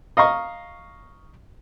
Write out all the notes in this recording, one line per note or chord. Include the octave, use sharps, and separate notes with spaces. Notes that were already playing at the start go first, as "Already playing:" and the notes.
D#5 F5 A#5 C#6